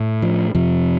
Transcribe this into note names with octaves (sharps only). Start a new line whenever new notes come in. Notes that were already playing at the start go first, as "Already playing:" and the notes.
Already playing: A2
F3
F2 C3 F3